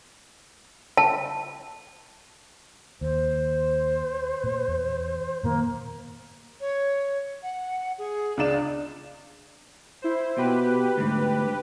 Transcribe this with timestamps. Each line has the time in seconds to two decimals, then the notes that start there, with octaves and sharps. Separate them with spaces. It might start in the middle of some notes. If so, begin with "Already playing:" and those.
0.97 A5
3.01 D#2 C5
4.44 A#2 A#3
4.68 E2
5.43 F#2 A#2 D#3 A#3
6.60 C#5
7.43 F#5
7.98 G#4
8.37 C#2 D4 D5 E7
10.02 E4 C5
10.38 B2 G4 B4
10.98 D2 G#2